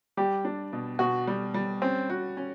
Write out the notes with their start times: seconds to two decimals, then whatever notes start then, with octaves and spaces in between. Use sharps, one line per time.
0.17 G3 G4
0.45 D4
0.73 B2
0.99 B2 F#4
1.27 G3
1.54 G3
1.82 C4 C#4
2.10 F#4
2.37 C#4